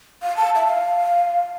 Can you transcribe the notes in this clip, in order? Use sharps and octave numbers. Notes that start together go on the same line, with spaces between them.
F5
A5
E5
F5